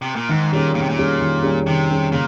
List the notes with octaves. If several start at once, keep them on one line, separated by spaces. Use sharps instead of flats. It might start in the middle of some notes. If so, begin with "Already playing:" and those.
C3
A#2
G#2 D#3
A#2 G3 C#4 G#4
A#2 D#3
C3
A#2
G3 C#4 G#4
D#3
G3 C#4 G#4
C3 D#3
G3 C#4 G#4
A#2 C#3